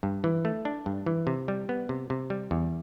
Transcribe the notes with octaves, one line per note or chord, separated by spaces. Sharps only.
G2
E3
A3
D4
G2
E3
C3
G3
B3
C3
C3
G3
E2